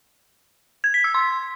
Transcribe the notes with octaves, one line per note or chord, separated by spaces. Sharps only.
G#6
B6
E6
C6